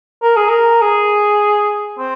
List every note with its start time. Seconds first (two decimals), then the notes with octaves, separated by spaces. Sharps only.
0.23 A#4
0.36 G#4
0.49 A#4
0.81 G#4
1.98 C4